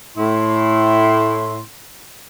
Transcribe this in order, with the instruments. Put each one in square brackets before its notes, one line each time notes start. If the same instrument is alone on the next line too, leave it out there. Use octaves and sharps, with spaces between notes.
[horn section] A2 E4 C6